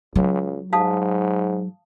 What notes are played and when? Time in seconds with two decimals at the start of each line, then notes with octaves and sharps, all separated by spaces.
0.15 C#2 F#3
0.73 G#2 F5 A5 D#6